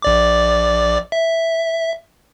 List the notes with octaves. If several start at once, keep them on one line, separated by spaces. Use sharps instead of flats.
A#1 D5 D6
E5